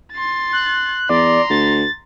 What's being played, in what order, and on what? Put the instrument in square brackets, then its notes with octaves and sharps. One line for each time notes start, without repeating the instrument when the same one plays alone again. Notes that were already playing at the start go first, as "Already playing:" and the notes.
[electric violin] C6 A6
[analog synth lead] F#6
[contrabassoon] E2 [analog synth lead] D5 [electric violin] A#5 C6
[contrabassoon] D2 [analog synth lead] A6